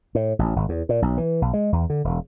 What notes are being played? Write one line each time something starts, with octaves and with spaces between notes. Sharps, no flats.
A2
A1
G#1
E2
A#2
B1
E3
B1
G#3
E2
D3
E1